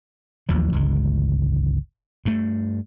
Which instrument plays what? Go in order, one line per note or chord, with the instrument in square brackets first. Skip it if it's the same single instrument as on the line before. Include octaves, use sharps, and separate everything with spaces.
[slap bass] A1 D#2 F3 F#3
G1 C#2 G#3
G2 A3